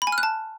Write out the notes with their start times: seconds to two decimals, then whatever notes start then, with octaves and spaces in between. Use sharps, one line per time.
0.02 B5
0.07 G#5
0.12 F6
0.18 F#6
0.23 A5